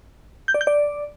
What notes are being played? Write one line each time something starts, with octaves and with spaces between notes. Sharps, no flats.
G6
D5
G6
D5